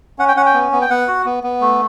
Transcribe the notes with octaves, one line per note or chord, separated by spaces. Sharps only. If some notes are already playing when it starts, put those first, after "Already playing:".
C#4 F#5
G5
C#4 F#5
G5
B3
B3
G5
B3 F#5
F#4
B3
B3
A3